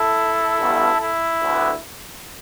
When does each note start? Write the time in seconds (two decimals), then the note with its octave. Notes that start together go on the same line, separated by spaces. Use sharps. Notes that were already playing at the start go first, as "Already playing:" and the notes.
Already playing: E4 A4
0.59 A1 G2 G3 B3
1.02 E4
1.43 D2 D3 B3